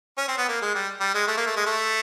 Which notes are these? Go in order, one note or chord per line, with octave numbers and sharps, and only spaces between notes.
C#4
C4
B3
A#3
G#3
G3
G3
G#3
A3
A#3
A3
G#3
A3